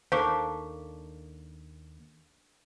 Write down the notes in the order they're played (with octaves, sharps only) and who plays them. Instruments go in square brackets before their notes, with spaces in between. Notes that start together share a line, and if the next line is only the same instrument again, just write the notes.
[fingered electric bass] D#2 [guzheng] A#3 D4 A4 [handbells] C5 [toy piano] F5 C#6 D6